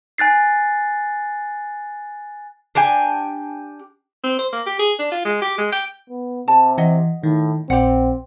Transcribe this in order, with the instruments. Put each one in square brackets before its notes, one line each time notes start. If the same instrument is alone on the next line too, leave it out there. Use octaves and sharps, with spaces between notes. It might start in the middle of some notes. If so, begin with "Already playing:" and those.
[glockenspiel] G#5 F#6 A6 C7
[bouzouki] D4 G4 G5 G#5
[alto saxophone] C4
C5
A#3
G4
G#4
D4
F4
G#3
G4
G#3
G5
[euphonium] B3
[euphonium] C3 [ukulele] A5
[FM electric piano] E3 [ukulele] D#5 F#5
[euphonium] A2 [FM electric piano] D#3
[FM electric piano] A#1 [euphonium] C4 [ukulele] G4 F#5